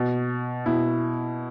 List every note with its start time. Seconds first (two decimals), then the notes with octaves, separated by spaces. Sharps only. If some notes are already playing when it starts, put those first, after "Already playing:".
Already playing: B2
0.66 B2 E4